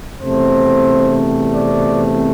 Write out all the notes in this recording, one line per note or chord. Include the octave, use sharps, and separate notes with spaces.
E2 C3 A3 C4 C5
D5